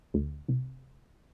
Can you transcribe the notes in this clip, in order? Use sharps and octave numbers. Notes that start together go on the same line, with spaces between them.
D2
C2